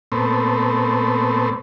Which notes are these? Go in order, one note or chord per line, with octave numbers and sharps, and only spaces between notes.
A#2 A3 B3 C4